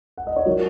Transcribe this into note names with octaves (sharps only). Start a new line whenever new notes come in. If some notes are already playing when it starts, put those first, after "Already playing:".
F#5
D#5
C#5
F#3 F#4 A#4